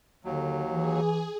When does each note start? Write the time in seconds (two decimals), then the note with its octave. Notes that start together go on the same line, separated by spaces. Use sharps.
0.25 D#2 D3 F#3
0.72 E3 G#4